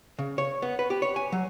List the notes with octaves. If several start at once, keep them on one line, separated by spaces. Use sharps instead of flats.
C#3
C#5
B3
B4
G4
C#5
G#5
F#3